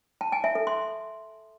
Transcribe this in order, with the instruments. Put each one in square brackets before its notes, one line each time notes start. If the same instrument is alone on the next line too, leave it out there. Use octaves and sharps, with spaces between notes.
[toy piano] A5
G#5
E5
A4
C6